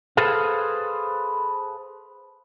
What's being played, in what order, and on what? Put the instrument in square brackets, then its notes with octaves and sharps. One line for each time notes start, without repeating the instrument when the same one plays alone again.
[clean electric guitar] G#4 A4 B4 C5 F5